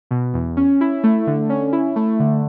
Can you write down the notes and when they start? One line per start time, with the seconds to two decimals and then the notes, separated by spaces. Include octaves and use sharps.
0.11 B2
0.34 E2
0.57 C#4
0.81 E4
1.03 A3
1.27 D3
1.49 C#4
1.73 E4
1.96 A3
2.20 D3